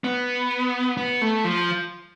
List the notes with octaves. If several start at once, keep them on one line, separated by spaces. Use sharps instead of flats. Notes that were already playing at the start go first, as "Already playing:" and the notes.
B3
B3
A3
F3